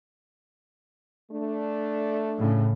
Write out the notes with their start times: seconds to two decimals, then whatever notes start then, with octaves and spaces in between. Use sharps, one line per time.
1.31 A3 D4
2.38 A2 C#3